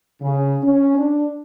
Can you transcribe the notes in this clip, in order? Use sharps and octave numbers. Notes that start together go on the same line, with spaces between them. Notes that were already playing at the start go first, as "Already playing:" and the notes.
C#3
C#4
D4